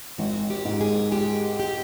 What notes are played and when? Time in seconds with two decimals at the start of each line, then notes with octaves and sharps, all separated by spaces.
0.18 G#1 F#4
0.50 G4
0.65 G#2
0.81 G#4
1.12 G#3 G4
1.60 G4